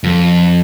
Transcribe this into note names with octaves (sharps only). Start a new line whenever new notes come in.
F2